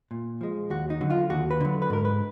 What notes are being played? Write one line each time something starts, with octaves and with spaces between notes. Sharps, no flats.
A#2
F3 G#3
D#2 F#4
D#4
D3 F#3
F4
D#2 F#4
B4
D3 F#3
B4
G#2 A#4
B4